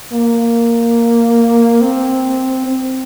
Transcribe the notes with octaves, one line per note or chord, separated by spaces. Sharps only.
A#3
C4
C4